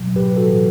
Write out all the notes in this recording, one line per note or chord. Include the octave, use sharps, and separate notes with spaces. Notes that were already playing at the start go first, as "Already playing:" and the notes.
Already playing: B2 F#3
A2 G4 B4
F#4 A4
E3